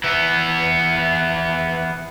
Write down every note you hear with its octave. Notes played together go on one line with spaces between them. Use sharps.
E3 B3